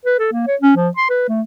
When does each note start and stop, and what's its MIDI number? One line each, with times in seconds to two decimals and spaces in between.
0.05 0.16 71
0.19 0.30 69
0.32 0.46 58
0.47 0.56 73
0.61 0.73 61
0.76 0.89 53
0.97 1.08 84
1.10 1.28 71
1.28 1.42 57